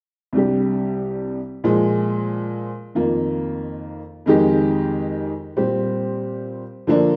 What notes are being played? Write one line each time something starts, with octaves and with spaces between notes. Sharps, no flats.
C2 C3 G3 D4 G4
A#2 F3 G#3
F2 D#3 A#3 F4
F2 D#3 G#3 D#4 G4
A#2 G3 C4 G4
D3 F3 A#3 D4